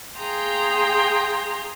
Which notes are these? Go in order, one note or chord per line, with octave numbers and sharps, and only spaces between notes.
G#4 F5 G5 A#5 C6